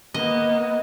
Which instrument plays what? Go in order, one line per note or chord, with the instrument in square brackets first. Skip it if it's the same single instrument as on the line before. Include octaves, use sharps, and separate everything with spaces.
[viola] A#3 B3 [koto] D#5